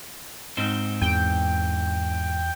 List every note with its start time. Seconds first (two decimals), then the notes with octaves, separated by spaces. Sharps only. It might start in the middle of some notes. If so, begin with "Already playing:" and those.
0.57 G#2 C4 D#4
1.01 E2 G5